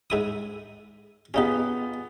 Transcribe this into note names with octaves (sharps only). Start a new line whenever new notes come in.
G#2 E4 D#6
B3 C#4 D#4 F4 G4 G#4